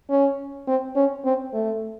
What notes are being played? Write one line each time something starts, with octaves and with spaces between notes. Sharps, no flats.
C#4
C4
C#4
C4
A3